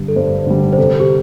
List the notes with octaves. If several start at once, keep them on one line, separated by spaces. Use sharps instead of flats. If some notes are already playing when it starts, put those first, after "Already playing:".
Already playing: G2 D3 G3
A4
G2 C5
D3 G3
C5
C3 A4
G4